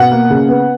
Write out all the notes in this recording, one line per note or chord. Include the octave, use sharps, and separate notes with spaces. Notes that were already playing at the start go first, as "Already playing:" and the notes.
Already playing: B2 F#5
A#3
C#3
B3